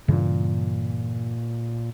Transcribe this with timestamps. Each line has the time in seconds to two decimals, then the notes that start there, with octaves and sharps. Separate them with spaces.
0.08 G2 A#2 C#3 E3